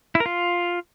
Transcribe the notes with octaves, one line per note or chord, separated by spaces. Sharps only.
E4
A#4
F4